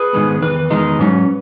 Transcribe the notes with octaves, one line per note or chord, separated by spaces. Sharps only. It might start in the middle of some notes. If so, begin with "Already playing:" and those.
Already playing: G#4 B4
G#2 D#3 G#3 B3
E2 D#3 B4
E2 D#3 G#3 D#4
G#2 F#3 C#4